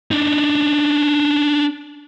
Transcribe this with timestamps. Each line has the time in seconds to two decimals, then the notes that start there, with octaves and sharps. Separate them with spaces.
0.11 D4 D#4